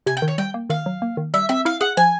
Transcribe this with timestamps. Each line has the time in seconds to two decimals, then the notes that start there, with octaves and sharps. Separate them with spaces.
0.06 C3 G#5
0.17 G5
0.22 D#3
0.28 C#5
0.38 G3 G5
0.54 A#3
0.70 D#3 F5
0.86 F#3
1.02 A#3
1.17 D#3
1.34 G3 E5
1.49 C4 E5
1.65 E4 F5
1.81 G#4 F#5
1.97 F3 G#5